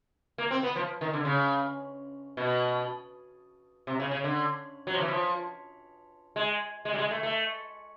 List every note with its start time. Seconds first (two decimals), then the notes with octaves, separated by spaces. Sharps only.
0.38 A#3
0.51 C4
0.63 B3
0.76 F3
1.01 D#3
1.13 D3
1.25 C#3
2.37 B2
3.87 C3
4.00 C#3
4.11 C#3
4.24 D3
4.87 F#3
4.94 F3
5.01 E3
5.08 F3
6.36 G#3
6.85 G#3
6.94 G3
6.98 G#3
7.11 A3
7.23 A3